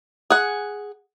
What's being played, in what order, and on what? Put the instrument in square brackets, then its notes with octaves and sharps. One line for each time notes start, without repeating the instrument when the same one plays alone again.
[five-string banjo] G#4 F#5